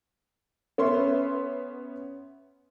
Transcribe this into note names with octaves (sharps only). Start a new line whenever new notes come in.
B3 C#4 E5 C6